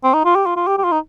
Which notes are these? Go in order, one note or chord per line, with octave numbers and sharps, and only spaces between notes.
C4
D#4
F4
G4
F4
F4
G4
G4
F4
D#4